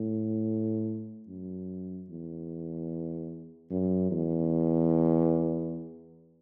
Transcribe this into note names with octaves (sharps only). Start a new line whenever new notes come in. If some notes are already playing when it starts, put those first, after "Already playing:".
Already playing: A2
F#2
E2
F#2
E2